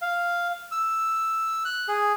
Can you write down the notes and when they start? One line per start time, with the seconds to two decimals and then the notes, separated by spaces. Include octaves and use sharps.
0.02 F5
0.72 E6
1.65 F#6
1.88 G#4